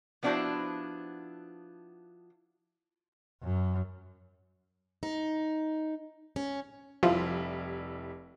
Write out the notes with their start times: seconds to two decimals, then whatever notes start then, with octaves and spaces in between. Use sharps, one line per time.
0.23 F3 B3 D4 E4 F#4 C5
3.43 F#2
5.03 D#4
6.36 C#4
7.03 F1 F3 G3 E4